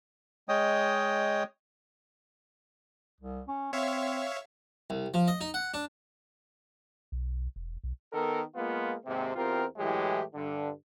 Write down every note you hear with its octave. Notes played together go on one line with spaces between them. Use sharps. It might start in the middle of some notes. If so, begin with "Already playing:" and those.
G#3 C#5 D#5 G5 D#6
C2
C#4
C4 C#5 E5 F5
C2
F3
D#5
D#4
F#5
D4
B1
E1
B1
D#3 B3 A4 A#4
G#3 A#3 B3 F4
D#2 G#2 C3
E2 C4 F4 G4 A#4
A2 E3 F#3 G#3 G4
G2 D3